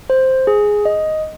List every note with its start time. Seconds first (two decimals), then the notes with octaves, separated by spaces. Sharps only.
0.10 C5
0.47 G#4
0.85 D#5